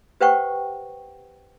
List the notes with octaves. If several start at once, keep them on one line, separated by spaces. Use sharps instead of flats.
G4 B4 C5 F#5 G5 C#6